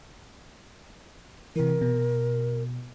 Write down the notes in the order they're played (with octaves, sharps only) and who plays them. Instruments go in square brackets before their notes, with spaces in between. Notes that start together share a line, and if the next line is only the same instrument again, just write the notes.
[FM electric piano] C3 E3 [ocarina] A#4
[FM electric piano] B2